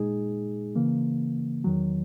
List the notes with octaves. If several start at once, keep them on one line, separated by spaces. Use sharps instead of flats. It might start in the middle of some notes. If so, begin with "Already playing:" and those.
Already playing: A#2 G#3 D#4 G#4
C#3 E3 A#3
E2 D#3 F#3